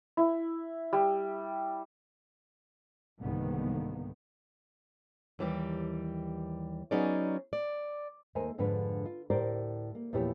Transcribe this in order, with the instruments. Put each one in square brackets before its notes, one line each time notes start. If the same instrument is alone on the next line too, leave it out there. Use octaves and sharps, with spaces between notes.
[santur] E4
G3
[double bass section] C2 G#2 D3 D#3 A#3 B3
[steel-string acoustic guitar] D#2 E3 G3 G4
F#3 B3 C#4 D#4 G#4 D5
D5
[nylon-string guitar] D#2 A3 A#4 C5 G#5
F2 G#2 D3 F3 D4 B4
F4
D2 A2 G4 A#4 C5 D5
A#3
E2 A#2 F3 E4 G4 C#5